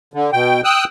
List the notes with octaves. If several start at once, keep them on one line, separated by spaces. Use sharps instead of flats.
D3
B2 G5
G5 D#6 E6 F#6